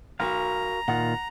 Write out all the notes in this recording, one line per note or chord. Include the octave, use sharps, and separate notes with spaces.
B1 F#4 A#4 F5 A#5
A#2 D#3 F4 F#5